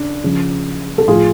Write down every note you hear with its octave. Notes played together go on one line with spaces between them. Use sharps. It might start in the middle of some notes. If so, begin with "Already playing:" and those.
Already playing: C#3 D4
C#3 F3
A4
A2 F3 F4 G#4